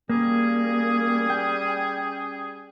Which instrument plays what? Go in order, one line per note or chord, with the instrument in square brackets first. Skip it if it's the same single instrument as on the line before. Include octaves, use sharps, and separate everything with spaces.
[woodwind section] G3 C#4 G#4 [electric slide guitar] A#3
[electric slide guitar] G5